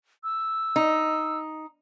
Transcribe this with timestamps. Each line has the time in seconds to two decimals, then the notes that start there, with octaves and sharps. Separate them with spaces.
0.24 E6
0.76 D#4